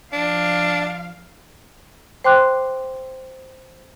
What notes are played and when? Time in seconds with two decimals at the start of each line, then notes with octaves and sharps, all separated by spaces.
0.13 F3 D4 F5
2.24 C5 G5 C6 D6 F#6